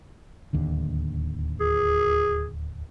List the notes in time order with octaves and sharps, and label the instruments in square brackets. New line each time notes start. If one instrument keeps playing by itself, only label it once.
[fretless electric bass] D1 D#2 D3
[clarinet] G#4